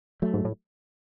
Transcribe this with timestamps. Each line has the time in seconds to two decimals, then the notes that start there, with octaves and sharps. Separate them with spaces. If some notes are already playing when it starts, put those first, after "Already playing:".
0.22 F#3 A3
0.33 G#2
0.45 A2